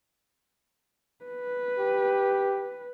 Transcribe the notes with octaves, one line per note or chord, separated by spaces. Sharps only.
B4
G4